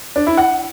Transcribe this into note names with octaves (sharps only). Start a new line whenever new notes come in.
D4
E4
F#5